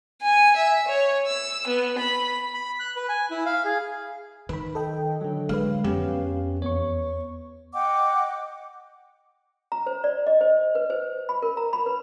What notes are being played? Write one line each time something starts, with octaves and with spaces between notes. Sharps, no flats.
G#5
E5
C#5
E6
B3
B5
B5
F#6
B4
G#5
E4
F5
G#4
D#3 B4 B5
A4 D#5 G5
D3 F#3
G#3 B4 F5
F2 B3 C#4 G4
E2 B3 C#5 C#6
D#5 F#5 G5 D6
A#5
C5
D5
D#5
C5
B4
C5
B5
A#4
A#5
B5
B4